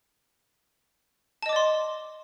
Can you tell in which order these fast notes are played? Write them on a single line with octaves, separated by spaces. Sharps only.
A5 D#5 D6 D5 C6